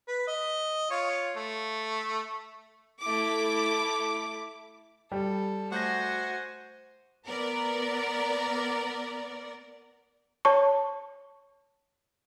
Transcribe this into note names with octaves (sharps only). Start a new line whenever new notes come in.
B4
D#5
F4 C#5
A3
A3 E4 D6
G3 A4
A3 F#4 C5 G#5 G6 A#6
B3 A#4 D5
C#5 A5 C#6